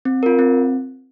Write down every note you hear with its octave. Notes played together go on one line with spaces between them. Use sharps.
C4
F4 A#4
C4